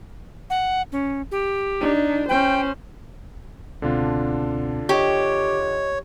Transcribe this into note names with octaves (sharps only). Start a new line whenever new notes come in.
F#5
C#4
G4
D4 D#4
C#4 C5 G5
C#2 B2 D3 C4 D4 F4
G4 C#5 D#5 C#6